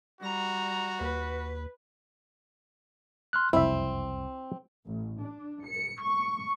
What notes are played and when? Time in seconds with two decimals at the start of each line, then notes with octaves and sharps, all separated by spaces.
0.21 G3 F#4 A#5
1.01 D#2 B4
3.33 C6 F6 F#6
3.53 F#1 C2 F2 C3 C4 E4 E5
4.86 A1
5.20 D4
5.66 C#7
6.00 C#6